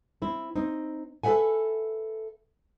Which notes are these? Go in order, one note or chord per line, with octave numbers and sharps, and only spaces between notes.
C4 E4
C4 D#4
A4 B4 C#5 E5 F#5 G#5